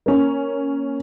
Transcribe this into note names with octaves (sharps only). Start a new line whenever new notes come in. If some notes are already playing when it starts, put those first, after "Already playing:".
A#3 C#4